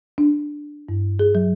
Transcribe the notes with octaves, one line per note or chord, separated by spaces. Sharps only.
D4
G2
G#4
F#3